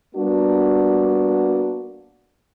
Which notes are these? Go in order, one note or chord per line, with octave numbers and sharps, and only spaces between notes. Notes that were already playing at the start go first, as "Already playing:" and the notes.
G3 A#3 B3 D4 F#4